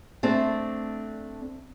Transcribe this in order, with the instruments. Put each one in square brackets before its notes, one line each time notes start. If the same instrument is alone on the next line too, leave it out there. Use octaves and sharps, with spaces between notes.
[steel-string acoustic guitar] A3 C4 D4